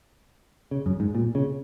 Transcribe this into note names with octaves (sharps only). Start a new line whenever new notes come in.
C#3
F#2
G#2
A#2
C#3